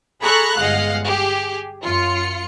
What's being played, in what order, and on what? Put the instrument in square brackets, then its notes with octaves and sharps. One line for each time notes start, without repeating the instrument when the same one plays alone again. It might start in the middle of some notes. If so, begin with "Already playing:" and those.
[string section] G#4 A4 A#5 B5 C#6 F#6
G1 G#3 D#5 F5 F#5
G4 G#4
F#2 F4 C#7